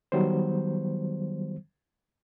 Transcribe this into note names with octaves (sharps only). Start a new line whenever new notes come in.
D#3 F#3 G3 B3 C5